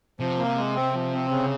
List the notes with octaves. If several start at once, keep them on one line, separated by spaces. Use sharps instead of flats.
C3 F3
A#3
G#3
C4
F3
C4
C#3